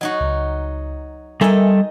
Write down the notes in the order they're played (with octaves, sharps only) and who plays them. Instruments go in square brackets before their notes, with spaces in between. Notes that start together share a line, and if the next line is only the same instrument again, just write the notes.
[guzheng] F#3 D#4 F#4 [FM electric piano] D#5
[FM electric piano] C#2
[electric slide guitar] G3 A4 [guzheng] D#4 D#5 [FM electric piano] A#4 E5 G#5